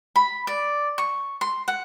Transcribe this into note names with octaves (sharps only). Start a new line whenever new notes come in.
B5
D5
C#6
C6
F#5